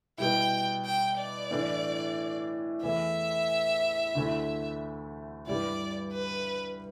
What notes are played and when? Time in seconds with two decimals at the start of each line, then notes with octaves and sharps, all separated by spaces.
0.18 B2 G3 E4 G5
0.85 G5
1.18 D5
1.51 A2 E3 A3 D4
2.83 E2 E3 A3 E4 E5
4.15 D2 D3 A3 E4
5.47 G2 G3 E4 D5
6.13 B4